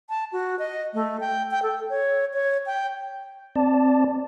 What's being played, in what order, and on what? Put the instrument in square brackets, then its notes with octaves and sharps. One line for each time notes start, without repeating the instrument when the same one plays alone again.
[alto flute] A5
F#4
D#5
A3
G5
G5
A4
C#5
C#5
G5
[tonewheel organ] C4 D5 A5